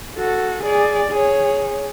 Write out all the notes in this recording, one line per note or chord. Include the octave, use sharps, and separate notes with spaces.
F#4 A4
G#4 D5
G#4 C#5